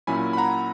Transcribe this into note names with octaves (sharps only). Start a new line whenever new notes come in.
A#2 F#3 C#4 E4 G#5 B5
B5
F#5 A#5